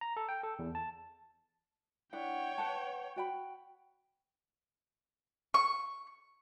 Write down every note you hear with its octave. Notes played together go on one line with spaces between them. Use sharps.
A#5
A4
G5
A4
E2
A5
D4 E4 C#5 F#5 G5
B4 F#5 A5
F#4 G5 B5
C#6